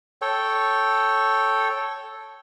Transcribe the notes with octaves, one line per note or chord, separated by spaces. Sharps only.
A4 C#5 G5